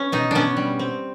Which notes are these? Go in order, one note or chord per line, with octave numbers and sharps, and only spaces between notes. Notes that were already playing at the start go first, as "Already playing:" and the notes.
Already playing: B3 C#4
B2 D#4
B3 C#4 D4
G3
C4